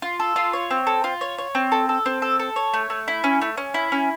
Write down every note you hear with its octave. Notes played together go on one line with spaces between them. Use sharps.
F4
A4
F4
C#5
C4
A4
F4
C#5
C#5
C4
A4
A4
C4
A4
A4
C#5
A3
A3
E4
C#4
A3
C#4
E4
C#4